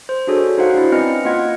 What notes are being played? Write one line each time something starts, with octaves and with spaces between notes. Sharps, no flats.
C5
D4 F#4 G#4 A4 C#5
D#4 F#4 C5 F5 F#5
D4 E4
C4 C#4 B4 D#5 F6 C#7
A#3 F4 D#5 F#5 G#6